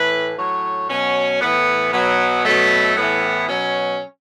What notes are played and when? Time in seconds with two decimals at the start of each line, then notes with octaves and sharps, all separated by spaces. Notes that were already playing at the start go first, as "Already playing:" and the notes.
Already playing: A2 E3 B4
0.37 A2 F#3 C#5
0.89 B2 F#3 C#4
1.41 A2 E3 B3
1.93 B2 F#3 B3
2.44 B2 F#3 A3
2.96 A2 E3 B3
3.48 B2 F#3 C#4